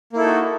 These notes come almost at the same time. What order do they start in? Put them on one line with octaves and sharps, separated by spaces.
A#3 E4 A4 D#4 F#4